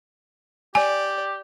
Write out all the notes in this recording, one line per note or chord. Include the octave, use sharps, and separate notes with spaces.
G4 D5 G#5